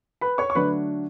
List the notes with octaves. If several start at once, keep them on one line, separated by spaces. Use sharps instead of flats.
B4 B5
C#5 C#6
C#6
D3 F#3 A3 D4 B4 B5